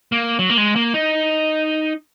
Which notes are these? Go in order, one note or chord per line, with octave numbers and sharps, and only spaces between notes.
A#3
F#3
A#3
G#3
A#3
D#4